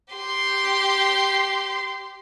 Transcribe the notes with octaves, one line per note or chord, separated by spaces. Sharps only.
G4 C6